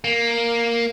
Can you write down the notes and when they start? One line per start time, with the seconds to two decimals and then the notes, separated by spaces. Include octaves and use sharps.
0.04 A#3